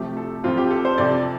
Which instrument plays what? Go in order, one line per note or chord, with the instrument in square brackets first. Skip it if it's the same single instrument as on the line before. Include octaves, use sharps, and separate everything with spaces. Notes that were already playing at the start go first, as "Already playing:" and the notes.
Already playing: [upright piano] C3 F3 A3 G4
A4
F2 F3 C4 F4
G4
A4
C5
F2 C3 F3 D5